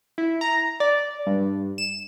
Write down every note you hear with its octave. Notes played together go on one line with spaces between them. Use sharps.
E4
A#5
D5
G2
E7